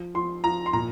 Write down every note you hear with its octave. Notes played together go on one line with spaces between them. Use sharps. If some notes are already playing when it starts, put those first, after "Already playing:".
Already playing: F3
F3 C6
F3 A#5
C6
A#2 A#5